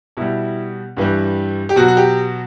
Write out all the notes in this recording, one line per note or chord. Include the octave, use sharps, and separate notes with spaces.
B2 G3 E4
G2 E3 G3
G4
B2 F#3 F#4
F#4
G4